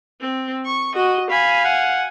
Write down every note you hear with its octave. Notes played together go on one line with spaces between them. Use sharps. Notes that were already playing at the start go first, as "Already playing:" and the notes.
C4
C#6
F#4 D#5
F5 G#5 B5
F#5